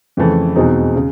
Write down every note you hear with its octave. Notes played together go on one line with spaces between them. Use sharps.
F2 C#3 E3 A3
E2 B2 G#3 C4 D#4
C#3